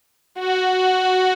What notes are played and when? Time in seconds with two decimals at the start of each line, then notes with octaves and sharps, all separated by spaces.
0.39 F#4